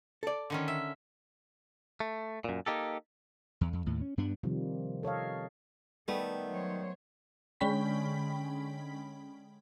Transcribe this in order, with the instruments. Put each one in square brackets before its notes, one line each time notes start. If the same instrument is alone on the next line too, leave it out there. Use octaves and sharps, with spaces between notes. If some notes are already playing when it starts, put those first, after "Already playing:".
[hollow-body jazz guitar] A4 D5
[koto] D3 D#3 C#4
E5
[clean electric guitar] A3
F#2 A#2
A#3 D#4 G4 A4
[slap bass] E2
F2
D#2 A2
C#4
G2 G3 B3 D4
[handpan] C3 D#3 F3 G3
A4 C#5 D#5 F5
[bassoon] D#3 [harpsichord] G3 [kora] A3 B3 [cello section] A4
[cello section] F#3 C5 C#5
[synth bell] D3 G#3 C#4 G5 B5 B6